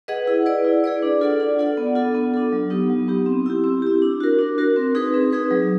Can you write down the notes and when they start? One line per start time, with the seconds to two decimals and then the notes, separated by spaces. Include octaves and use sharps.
0.08 G#4 B4 D#5 F#5
0.27 E4
0.46 G#4 B4 D5
0.65 E4
0.84 G#4 B4 D5
1.02 D4
1.21 F4 A4 D5 F#5
1.40 D4
1.58 F4 A4 D5 F#5
1.77 B3
1.95 D4 F4 A4
2.15 B3
2.34 D4 F4 A4
2.52 F#3
2.70 B3 D#4 G4
2.90 F#3
3.08 B3 D#4 G4
3.26 C4
3.46 E4 G4
3.64 C4
3.82 E4 G4
4.02 D4
4.20 F#4 A#4
4.39 D4
4.58 F#4 A#4
4.76 C4
4.95 D#4 G#4 B4
5.14 C4
5.32 D#4 G#4 B4
5.51 F#3